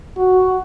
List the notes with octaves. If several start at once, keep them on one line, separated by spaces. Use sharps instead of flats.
F#4